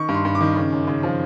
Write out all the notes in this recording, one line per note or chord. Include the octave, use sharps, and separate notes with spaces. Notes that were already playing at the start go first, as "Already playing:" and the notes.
Already playing: D#3 C#6
G2
C6
G2
D6
D#3
C#3
F#2
C#3
F3